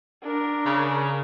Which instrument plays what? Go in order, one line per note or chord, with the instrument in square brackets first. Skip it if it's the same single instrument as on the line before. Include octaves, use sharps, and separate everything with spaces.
[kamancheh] D4 A#4
[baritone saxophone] C#3